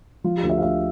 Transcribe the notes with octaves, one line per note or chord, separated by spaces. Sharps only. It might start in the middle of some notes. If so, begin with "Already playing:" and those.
F3 F4
G4
D2
E5
F5
D2 E5